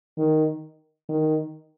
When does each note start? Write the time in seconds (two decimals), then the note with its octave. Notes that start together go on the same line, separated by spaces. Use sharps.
0.18 D#3
1.09 D#3